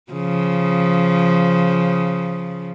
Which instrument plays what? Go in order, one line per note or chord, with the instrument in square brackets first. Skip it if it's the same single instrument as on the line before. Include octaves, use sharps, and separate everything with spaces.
[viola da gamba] C#3 F3